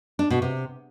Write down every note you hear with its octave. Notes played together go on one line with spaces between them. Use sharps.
D4
B2
C3